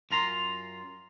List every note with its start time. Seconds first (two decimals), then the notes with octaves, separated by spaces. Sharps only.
0.11 F#2 F4 A#5 C6